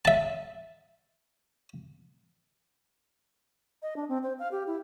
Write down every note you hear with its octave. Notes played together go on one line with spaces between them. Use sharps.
E5 A5
D#5
D4
C4
C5
F5
G4
E4